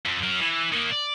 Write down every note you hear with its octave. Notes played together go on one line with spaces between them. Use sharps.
F2
F#3 A#4
E3
D#3 A#3
D5